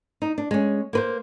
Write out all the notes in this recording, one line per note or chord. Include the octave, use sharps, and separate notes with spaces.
D#4
D4
G#3 C#4
A#3 B4 C5